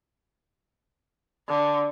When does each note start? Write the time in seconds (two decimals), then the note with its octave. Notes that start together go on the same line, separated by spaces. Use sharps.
1.48 D3